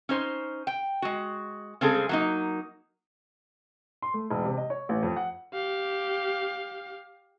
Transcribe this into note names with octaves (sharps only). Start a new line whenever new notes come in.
C#4 D#4 C5
G5
G#3 F#4
C#3 G3 G#3 C4 G#4 A4
F#3 A#3 D#4
C6
A3
E1
C3
D#5
C#5
A1
F2
F#5
G4 F5